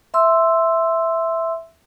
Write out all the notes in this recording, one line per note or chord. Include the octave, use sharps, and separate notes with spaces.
E5 C6 E6